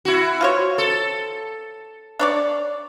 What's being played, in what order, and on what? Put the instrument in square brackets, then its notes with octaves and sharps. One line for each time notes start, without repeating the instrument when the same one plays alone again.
[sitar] E4 F#4
[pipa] F4 C5 C#5
[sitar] A4
[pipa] D4 C#5 D5